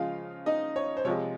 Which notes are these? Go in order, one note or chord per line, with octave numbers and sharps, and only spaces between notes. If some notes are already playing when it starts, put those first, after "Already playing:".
Already playing: C#3 F3 G#3 F4 F5
D#4 D#5
C#5
C5
C3 F3 G#3 C#5